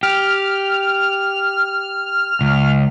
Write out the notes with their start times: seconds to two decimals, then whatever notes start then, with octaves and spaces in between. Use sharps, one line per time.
0.03 G4 F6
2.41 C#2